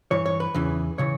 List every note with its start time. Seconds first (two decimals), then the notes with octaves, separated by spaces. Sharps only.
0.11 G2 E3 C#5
0.26 C#5
0.40 B4
0.54 E2 C#3 E3
0.98 C#3 E3 C#5